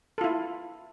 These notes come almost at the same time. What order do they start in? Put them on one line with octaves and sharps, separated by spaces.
A4 F4 E4